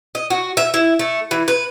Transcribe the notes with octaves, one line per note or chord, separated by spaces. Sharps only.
D#5
F#4
E5
E4
A3
E3
B4